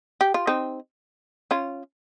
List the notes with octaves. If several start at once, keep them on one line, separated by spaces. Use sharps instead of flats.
G4
F4
C4 D#4
C#4 F4